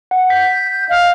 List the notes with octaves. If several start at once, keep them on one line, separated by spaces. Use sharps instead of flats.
F#5
G6 B6
D#5 F5